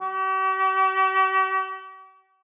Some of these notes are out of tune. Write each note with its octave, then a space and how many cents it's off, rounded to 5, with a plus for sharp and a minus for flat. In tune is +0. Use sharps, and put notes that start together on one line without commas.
G4 -45